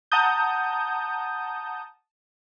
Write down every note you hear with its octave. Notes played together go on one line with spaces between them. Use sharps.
F#5 A5 A#5 D#6 G6